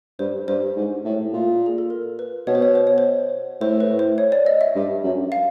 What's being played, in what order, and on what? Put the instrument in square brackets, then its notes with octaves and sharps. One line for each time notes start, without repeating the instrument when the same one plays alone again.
[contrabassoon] G2 [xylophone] C5
[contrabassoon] G2 [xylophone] C5
[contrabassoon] G#2
A2
A#2
[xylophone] G#4
A4
A#4
B4
[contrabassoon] B2 [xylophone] C#5
[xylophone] C5
C#5
C5
C#5
C5
[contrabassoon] A2 [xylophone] C5
[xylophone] B4
C5
C#5
D5
D#5
E5
[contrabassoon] G2
F#2
[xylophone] F5